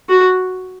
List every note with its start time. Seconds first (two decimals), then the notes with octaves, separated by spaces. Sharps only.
0.09 F#4